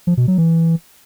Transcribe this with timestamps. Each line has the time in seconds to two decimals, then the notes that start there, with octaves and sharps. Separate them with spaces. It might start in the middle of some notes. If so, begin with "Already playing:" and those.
0.07 F3
0.17 B2
0.28 F#3
0.38 E3